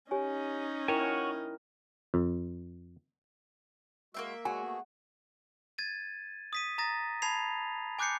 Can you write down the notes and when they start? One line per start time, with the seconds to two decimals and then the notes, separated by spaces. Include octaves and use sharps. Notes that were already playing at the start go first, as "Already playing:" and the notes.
0.11 C#4 D#4 G4 C#5 G#5
0.88 E4 F#4 A#4 C#5 G5 G#5
2.14 F2
4.14 G#3 A#3 C4 F#4 E5
4.45 G#3 F#4 G#4 C#5 G#5
4.61 A3 B3 G#4
5.78 G#6 A6 D#7
6.53 D#6 B6 D#7
6.78 A#5 D#6 A6 A#6
7.22 A5 B5 G#6 C7 F7
7.99 G#5 D6 F#6 G6 C7 C#7